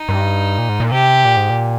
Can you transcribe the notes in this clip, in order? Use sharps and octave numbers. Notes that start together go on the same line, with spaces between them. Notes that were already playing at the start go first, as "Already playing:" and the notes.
Already playing: D#4
G2
A#2
G#2
A#2
C3 G4
A#2
G#2
A#2